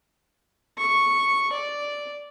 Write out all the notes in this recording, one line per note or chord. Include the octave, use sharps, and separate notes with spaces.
C#6
D5